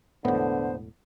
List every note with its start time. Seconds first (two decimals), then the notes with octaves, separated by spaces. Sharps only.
0.25 E1 A2 D3 B3 C5